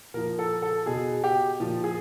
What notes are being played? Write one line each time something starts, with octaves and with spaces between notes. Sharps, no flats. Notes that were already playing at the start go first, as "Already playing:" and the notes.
A#2 F3 A#4
A4
A4
B2 G#4
G4
A#2 F3
G#4